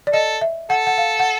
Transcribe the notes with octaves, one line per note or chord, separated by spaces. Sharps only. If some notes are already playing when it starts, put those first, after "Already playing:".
D5
A4 D#5
E5
A4 F#5
F#5
F5
F#5